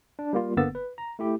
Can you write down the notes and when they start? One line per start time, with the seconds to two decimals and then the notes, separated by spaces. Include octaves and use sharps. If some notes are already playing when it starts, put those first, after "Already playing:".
0.19 D4
0.33 G3 A#3 F4
0.57 G1 D3 A#3 B3 E6 A6
0.75 B4
0.98 A#5
1.19 A3 E4 G4